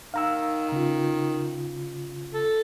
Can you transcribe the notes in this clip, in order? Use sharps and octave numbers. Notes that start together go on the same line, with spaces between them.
D#3 F5 A#5 E6
C#3 F4
A4